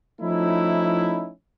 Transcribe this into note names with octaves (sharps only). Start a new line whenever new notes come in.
F3 A3 C#4 D#4 E4